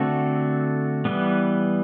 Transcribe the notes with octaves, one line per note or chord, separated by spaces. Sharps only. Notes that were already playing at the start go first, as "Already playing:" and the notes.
Already playing: D3 A3 C4 F#4 A4
E3 G3 B3